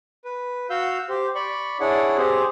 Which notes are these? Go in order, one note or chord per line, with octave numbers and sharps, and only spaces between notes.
B4
F#4 F5 E6 G6
G4 C5
D5 B5 C#6
D4 E4 G#4 C#5 D5 F#5
C4 G4 G#4 C5